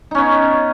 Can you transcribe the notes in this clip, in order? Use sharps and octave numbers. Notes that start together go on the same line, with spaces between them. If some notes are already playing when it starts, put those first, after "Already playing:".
B3 C#4 D#4